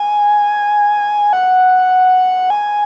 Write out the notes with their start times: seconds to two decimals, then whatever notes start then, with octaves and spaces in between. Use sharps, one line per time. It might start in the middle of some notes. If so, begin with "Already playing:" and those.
Already playing: G#5
1.33 F#5
2.50 G#5